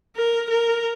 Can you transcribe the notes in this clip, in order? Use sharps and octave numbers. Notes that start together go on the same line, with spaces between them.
A#4
A#4